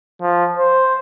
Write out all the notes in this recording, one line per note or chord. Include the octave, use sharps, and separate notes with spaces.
F3
C5